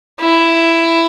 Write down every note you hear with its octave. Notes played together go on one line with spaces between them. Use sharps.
E4